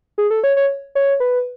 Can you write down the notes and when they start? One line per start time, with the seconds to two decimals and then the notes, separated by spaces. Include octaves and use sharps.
0.18 G#4
0.31 A4
0.44 C#5
0.57 C#5
0.95 C#5
1.20 B4